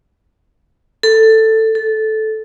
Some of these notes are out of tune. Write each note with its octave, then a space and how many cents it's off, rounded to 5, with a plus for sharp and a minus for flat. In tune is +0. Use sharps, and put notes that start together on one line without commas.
A4 +10
A4 -10